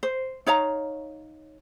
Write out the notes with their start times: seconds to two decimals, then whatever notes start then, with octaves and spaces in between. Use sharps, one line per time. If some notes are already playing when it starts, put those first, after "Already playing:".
0.03 C5
0.46 D#4 C#5 F5 A#5